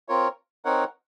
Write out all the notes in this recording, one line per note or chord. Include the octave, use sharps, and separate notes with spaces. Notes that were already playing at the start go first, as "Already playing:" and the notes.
C4 F4 A#4 C#5
C4 D#4 A#4 C#5 F#5